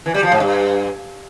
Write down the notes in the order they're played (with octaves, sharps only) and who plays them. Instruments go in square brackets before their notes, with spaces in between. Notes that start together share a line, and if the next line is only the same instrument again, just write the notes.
[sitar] E3
G3
F3
G#2
G2